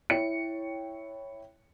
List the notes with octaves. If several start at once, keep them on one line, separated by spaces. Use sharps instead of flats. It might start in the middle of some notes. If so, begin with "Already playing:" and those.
E4 C#5 G5 C#7